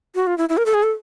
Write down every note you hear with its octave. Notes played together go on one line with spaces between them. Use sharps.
F#4
F4
E4
E4
A#4
A4
G#4
A4